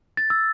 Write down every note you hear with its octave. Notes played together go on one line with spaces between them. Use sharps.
A6
E6